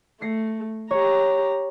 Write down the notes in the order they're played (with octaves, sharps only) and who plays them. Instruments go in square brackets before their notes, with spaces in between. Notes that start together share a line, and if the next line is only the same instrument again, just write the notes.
[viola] A3 [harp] A#6 C7 C#7
[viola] G4 A#5 [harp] C#5